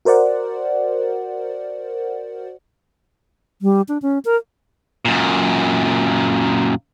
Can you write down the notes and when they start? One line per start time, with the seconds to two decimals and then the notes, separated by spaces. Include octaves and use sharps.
0.05 F#4 A#4 C5 D5 F#5
3.62 G3
3.88 D4
4.02 C#4
4.25 A#4
5.05 F#2 A#2